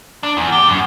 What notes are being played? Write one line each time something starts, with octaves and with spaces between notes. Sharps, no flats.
D4
E2
G4
F#2